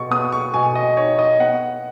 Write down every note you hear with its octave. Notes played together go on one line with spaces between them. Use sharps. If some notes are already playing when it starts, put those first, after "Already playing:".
Already playing: B2 C#6
B3 D#6
C#6
B2 G#5
D#5
D#4 C#5
D#5
B3 F#5